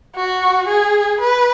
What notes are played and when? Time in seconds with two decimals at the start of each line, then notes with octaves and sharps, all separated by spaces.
0.15 F#4
0.68 G#4
1.20 B4